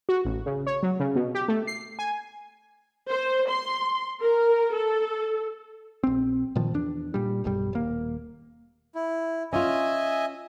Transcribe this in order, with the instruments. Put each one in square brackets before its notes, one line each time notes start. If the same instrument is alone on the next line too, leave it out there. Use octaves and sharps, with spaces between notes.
[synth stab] F#4
A1
C#3
C#5
F#3
C#3
B2
G4
A3
C7
G#5
[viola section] C5
C6
A#4
A4
[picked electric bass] A#1 C4
A#2 D#3 F3
E2 D4
A#2 G3
E1 B1 G2 G3
D#1 A#3
[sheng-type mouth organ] E4
[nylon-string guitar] C#4 F4 [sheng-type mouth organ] D#5 E5 G#5